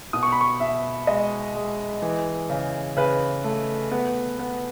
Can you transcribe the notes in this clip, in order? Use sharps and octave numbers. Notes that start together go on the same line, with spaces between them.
B2 D#6
C#6
B5
C#6
B2 E5
G#3 D#5
G#3
E3
C#3
C#3 B4
A3
B3
B3